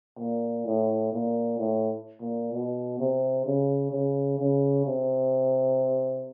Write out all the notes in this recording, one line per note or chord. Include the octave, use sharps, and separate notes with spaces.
A#2
A2
A#2
A2
A#2
B2
C3
C#3
C#3
C#3
C3